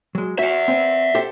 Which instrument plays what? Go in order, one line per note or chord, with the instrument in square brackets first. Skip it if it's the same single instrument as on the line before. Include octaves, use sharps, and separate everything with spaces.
[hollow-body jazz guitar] F#3 G#3
[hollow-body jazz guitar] F#4 [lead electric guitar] E5 F#5
[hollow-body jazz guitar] C4
G4 A4 C5